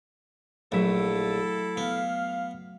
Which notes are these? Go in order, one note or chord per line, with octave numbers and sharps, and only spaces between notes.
A#1 F#3 A3 E4 A4 E5
B3 F5